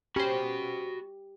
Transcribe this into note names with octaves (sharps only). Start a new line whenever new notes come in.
C#4 F#4 G4 C5 B5